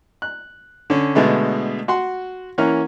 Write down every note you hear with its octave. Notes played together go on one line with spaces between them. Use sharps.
F#6
D3 C#4
B2 D3 G#3 A3 B3
F#4 F#5 C6
E3 A#3 C#4 F#5 F6